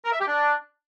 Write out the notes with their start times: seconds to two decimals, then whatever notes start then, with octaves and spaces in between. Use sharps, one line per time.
0.04 A#4
0.12 E5
0.20 G4
0.28 D4